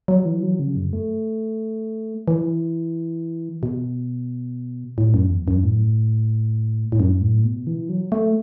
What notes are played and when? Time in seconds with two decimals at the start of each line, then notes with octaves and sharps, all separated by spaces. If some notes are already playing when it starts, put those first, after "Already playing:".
0.08 F#3
0.25 E3
0.43 F#3
0.59 C#3
0.76 F#2
0.93 A3
2.28 E3
3.63 B2
4.98 A2
5.14 F#2
5.30 E2
5.48 F#2
5.64 A2
6.92 A2
7.00 F#2
7.22 A2
7.44 B2
7.67 E3
7.89 F#3
8.12 A3